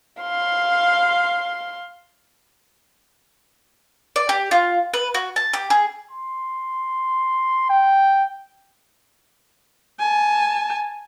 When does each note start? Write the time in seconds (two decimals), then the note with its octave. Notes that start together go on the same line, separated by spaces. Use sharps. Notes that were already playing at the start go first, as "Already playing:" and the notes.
0.21 F5 C6
4.16 D5
4.29 G4
4.51 F4
4.94 B4
5.14 F#4
5.36 A5
5.53 G4
5.70 G#4
6.11 C6
7.70 G5
9.99 G#5 A5